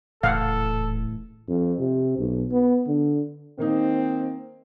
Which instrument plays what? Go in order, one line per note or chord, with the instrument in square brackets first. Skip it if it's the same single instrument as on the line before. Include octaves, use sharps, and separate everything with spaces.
[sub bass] D#1 [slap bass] A2 C#3 E3 [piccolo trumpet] A4 [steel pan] F5 F#5
[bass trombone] F2
C3
B1
B3
D3
[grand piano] D#3 A#3 D#4 [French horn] C4